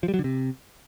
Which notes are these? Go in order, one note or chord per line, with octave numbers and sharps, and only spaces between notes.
F3
G3
F#3
D3
C3